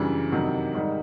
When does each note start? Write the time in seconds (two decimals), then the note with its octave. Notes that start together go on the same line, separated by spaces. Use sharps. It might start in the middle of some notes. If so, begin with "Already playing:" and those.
Already playing: F#2 C#3 E3 G3 D4
0.32 F2 C3 D#3 F#3
0.73 G#2 D#3 G3